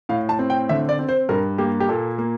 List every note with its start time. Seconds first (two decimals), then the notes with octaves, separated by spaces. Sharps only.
0.09 A2 F5
0.29 A5
0.39 C4
0.50 G5
0.69 D3 E5
0.89 D5
0.99 C4
1.09 C5
1.29 G2 A#4
1.58 A#3 G4
1.80 G4
1.89 A#2 A4
2.18 A#3